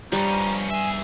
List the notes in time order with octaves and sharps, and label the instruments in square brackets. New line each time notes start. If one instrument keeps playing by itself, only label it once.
[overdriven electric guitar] G2 [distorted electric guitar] F3 C#4 [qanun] G3 [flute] A#5
[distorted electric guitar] G#4 E5 [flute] G#5